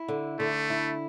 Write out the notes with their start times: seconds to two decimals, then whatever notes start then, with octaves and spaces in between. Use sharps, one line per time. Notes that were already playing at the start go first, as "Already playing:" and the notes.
Already playing: E4
0.08 D3
0.39 D3 A3
0.70 E4